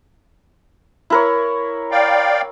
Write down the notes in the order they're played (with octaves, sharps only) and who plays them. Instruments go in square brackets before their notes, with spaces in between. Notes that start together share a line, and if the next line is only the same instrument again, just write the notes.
[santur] E4 A#4 C#5
[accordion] D5 F5 G5